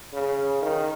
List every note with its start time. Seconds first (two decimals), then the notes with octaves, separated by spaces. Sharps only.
0.14 C#3
0.62 D#3